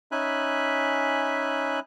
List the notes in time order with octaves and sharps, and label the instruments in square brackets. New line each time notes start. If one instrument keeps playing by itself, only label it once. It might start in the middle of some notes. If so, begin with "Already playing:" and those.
[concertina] C#4 D#4 E5 G#5 B5 F#6